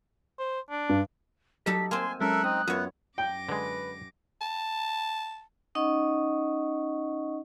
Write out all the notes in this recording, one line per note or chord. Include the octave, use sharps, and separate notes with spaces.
C5
D4
G2
F#3 G3 D#4 G4 A4 B6
A#3 C4 G#5 C6
F#3 G#3 C#4 A4 A#4 E5 F#6
C4 D#4 D#6
F#2 B3 F4 C#5
F#2 G5 D6 A#6
D3 G#3 B4
A5
C#4 D#4 D#5 F#5 C#6